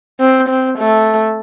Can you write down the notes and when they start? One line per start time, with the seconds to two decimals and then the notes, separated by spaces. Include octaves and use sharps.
0.20 C4
0.49 C4
0.78 A3